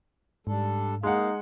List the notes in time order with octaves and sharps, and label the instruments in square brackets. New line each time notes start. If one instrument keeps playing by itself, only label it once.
[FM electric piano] G#2 [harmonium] G3 D4 A4
[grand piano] G#3 F#5 [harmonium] A#3 F5 [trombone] D#4